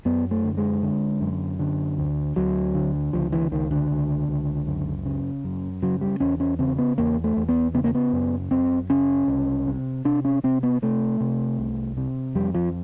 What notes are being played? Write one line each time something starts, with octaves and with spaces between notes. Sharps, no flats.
F#2 B3
A3
D3
G#3
D3
F#2
D3
D2
D2 F#3
D3
C#2 F3
E3
C#2 D#3
D3
C#2
C#2
F#2
C#3
F#2
C#3 F#3
G3
E2 C#4
C#4
C#3 C4
B3
E2 A#3
A3
E2
B3
C#3 B3
A#3
B3
F#2
F#2 C4
C#3 C#4
C2
C3
C3 D4
C#4
C3 C4
B3
C3 A3
C3
C2
C3
F2 G3
F3